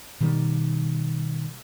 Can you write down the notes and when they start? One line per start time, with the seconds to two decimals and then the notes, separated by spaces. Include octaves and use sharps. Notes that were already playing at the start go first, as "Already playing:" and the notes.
0.20 B2 D#3 G3